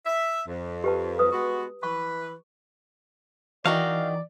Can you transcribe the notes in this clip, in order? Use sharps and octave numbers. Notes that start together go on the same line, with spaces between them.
E5
F2
G4 B4 A5
B4 D#6
G#3 B3 F#4
E3 B4 C#6
D#3 E3 D#4 F#4 D5 F5